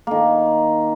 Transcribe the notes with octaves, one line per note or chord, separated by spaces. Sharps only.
D#3 A#3